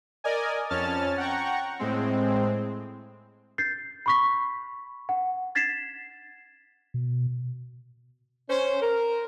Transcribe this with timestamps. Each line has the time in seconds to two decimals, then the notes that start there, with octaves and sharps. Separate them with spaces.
0.24 A#4 D5 D#5 G#5
0.70 F2 C#4 A5 F6 A6
1.18 F#5 G5 A#5 C#6
1.79 A2 G#3 C4
3.58 G6 A6 C7
4.06 B5 C#6 B6
5.09 F#5
5.55 G#6 A6 B6 C7 E7
6.94 B2
8.49 C#4 C5
8.81 A#4